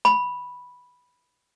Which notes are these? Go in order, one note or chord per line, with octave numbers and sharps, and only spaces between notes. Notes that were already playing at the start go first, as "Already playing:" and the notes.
B5